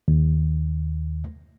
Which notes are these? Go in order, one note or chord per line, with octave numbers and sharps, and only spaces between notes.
D#2